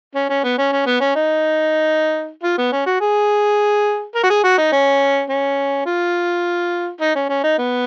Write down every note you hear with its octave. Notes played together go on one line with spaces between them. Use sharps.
C#4
C#4
B3
C#4
C#4
B3
C#4
D#4
F4
B3
C#4
F#4
G#4
A#4
F#4
G#4
F#4
D#4
C#4
C#4
F4
D#4
C#4
C#4
D#4
B3